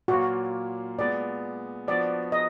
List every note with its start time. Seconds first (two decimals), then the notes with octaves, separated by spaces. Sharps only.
0.08 A#2 F#3 A#3 F4 F#4
0.98 A#2 G#3 B3 D5
1.87 F3 B3 D4 F#4 D5
2.32 D#5